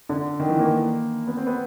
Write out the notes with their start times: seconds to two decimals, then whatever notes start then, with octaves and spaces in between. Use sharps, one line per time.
0.09 D3
0.40 D#3
0.49 E3
0.59 A#3
1.27 B3
1.37 C4
1.47 B3